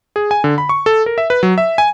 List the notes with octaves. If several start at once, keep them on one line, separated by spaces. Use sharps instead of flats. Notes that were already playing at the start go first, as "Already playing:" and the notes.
G#4
G#5
D3
B5
C#6
A4
A#4
E5
B4
F#3
E5
G#5